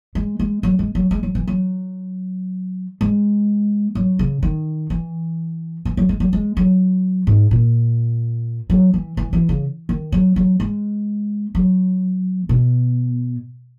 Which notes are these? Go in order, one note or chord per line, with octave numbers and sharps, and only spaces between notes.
G#3
G#3
F#3
G#3
F#3
G#3
F#3
E3
F#3
G#3
F#3
C#3
D#3
E3
E3
F#3
G#3
F#3
G#3
F#3
G#2
A#2
F#3
E3
E3
E3
C#3
D#3
F#3
F#3
G#3
F#3
B2